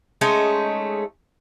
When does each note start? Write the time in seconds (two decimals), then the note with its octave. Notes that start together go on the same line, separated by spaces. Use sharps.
0.21 G#3 A3 C#4 D#4